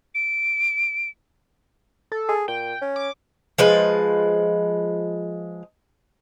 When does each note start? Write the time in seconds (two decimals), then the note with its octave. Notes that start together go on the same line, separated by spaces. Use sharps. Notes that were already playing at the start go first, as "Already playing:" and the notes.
0.15 D7
2.12 A4
2.29 G#4
2.48 A#2 G5
2.82 C#4
2.96 D6
3.58 F3 G#3 B4